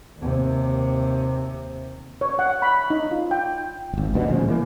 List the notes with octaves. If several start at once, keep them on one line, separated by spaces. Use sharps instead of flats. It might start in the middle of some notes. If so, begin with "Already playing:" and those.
D#2 C3
C#5
F#5
B5
D#4
F4
G5
D#1 G#1
D2 G2 B2
A#2 C#3 F3 G#3
E3 A#3